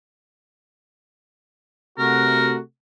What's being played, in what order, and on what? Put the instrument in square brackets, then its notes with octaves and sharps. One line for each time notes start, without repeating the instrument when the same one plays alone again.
[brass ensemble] C3 A3 F#4 [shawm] A#4